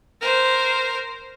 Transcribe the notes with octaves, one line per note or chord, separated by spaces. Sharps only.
A#4 C5